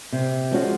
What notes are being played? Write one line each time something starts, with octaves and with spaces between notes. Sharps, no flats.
C3
F3 G#3 C#4 F#4